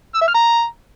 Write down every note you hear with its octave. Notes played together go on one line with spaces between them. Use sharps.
E6
E5
F6
A#5